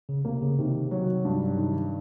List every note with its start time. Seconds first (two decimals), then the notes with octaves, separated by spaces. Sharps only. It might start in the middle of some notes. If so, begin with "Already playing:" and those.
0.09 C#3
0.25 C3 A#3
0.42 C#3
0.59 C3 D#3
0.91 F#3
1.25 G2
1.57 D#3